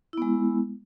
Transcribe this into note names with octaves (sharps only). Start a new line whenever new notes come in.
G#3 B3 E4